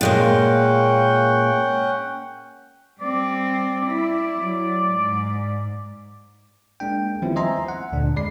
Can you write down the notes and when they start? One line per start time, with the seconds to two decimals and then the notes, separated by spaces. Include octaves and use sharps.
0.01 A#2 G#3 A#3 C#4 F#5 G5
3.01 G3 C4 D5
3.87 E4
4.37 F#3
4.89 G#2
6.80 G#3 A#3 D4 G5
7.22 D#3 F3 G3 B3 C4 E4
7.36 C5 D#5 E5 G#5 A#5 C6
7.68 F#5
7.92 D2 A#2 D3 D4
8.16 F2 G#3 D5 B5 C7